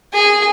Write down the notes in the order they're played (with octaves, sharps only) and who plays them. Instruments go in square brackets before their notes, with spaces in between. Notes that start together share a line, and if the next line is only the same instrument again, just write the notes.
[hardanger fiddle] G#4